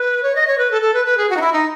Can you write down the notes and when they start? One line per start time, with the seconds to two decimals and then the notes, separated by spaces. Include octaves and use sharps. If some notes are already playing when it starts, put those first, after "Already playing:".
Already playing: B4
0.23 C#5
0.35 D#5
0.47 C#5
0.58 B4
0.71 A4
0.81 A4
0.94 B4
1.05 B4
1.17 G#4
1.29 F#4
1.37 D#4
1.41 E4
1.53 D#4